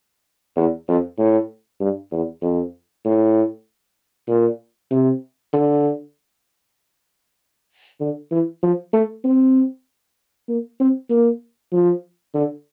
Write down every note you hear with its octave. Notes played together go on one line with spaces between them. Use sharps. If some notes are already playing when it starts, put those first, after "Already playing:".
E2
F2
A2
G2
E2
F2
A2
A#2
C3
D3
D3
E3
F3
A3
C4
A#3
C4
A#3
F3
D3